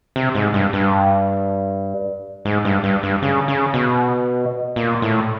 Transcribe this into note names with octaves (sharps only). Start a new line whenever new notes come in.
C3
G#2
G2
G2
G#2
G2
G2
G2
C#3
C#3
B2
A#2
A2